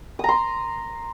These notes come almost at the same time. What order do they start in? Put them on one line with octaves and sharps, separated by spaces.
D#6 A#5 C6